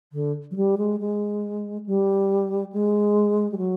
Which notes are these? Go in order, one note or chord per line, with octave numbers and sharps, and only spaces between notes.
D3
F#3
G3
G#3
G#3
G3
G#3
G3
F#3